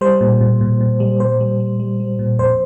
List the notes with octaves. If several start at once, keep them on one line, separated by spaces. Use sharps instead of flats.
G3 C5
A#2
A#2
A#2
A#2
G3
A#2 C5
G3
G3
G3
G3
A#2
F2 C5